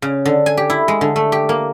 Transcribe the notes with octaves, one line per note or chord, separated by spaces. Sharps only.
C#3
D3
G#5
G4
E4
G#3
D3
A3
G4
A#3